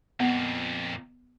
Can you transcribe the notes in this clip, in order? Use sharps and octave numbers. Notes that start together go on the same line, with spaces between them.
F2 A#2 B3